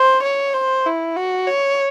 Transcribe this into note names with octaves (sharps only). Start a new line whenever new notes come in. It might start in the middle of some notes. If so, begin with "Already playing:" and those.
Already playing: C5
C#5
C5
E4
F#4
C#5